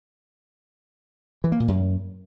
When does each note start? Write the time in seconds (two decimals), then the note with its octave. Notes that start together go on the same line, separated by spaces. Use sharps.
1.44 E3
1.52 A#3
1.60 A#2
1.68 F#2